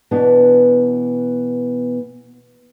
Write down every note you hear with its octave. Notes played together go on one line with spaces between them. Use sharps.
B2 E3 B3 D4